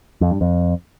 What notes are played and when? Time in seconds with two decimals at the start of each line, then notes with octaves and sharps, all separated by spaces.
0.21 F2
0.31 G2
0.41 F2